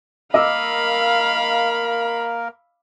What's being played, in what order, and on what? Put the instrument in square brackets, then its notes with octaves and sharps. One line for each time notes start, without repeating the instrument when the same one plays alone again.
[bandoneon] A#3 A#4 [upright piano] D#5 D6 E6 [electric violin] F5 B5